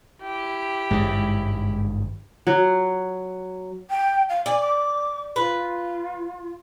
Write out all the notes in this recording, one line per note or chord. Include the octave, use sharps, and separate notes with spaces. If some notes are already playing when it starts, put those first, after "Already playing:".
E4 G4
G#1 G2 C#3 G#3
F#3
G5
F5
D5 G#5
D6
F4 B4